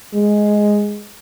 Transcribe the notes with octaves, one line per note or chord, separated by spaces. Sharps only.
G#3